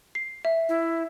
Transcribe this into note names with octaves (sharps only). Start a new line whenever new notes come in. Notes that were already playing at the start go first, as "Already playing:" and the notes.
C7
E5
E4